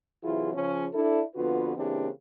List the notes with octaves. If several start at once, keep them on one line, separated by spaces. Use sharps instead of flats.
C3 E3 F#3 E4 F4 G#4
C#3 F3 C#4
D4 E4 A4
F2 D3 B3 F4 F#4 B4
C#3 E3 A#3 C4 D4 G4